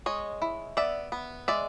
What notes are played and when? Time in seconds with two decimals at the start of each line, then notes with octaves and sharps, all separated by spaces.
0.06 G#3 C#5 D#5
0.42 E4
0.77 B3 D5 E5
1.12 B3
1.48 G#3 D5 E5